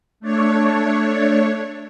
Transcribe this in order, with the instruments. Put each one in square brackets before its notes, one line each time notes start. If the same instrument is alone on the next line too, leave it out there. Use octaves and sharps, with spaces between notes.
[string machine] A3 D4 C#5